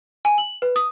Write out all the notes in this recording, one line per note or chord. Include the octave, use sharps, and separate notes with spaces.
G#5
F#7
B4
D#6